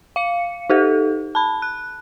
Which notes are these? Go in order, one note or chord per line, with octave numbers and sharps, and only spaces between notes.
F5 C#7
D#4 G4 A4
A5 B5
F#6